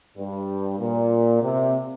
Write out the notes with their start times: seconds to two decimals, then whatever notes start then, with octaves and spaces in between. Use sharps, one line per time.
0.17 G2
0.79 A#2
1.42 C3